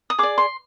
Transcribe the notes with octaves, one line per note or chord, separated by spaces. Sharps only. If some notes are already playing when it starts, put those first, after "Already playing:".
D#6
G#4 D5 D6
C6